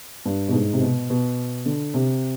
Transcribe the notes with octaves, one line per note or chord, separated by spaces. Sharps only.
G2
B2
G#2
C3
B2
B2
D3
C3